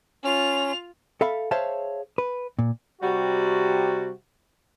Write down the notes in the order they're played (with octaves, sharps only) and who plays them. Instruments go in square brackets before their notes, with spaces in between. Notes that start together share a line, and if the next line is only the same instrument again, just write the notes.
[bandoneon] C#4 [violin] F4 F7
[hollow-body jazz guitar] A4 E5 F5 B5
G#4 C5 C#5 E5 F5 A5
B4
A#2
[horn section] C3 G3 F#4